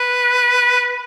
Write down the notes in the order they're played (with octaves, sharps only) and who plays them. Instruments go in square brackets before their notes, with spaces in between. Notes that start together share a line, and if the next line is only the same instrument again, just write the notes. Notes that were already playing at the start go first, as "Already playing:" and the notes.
Already playing: [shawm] B4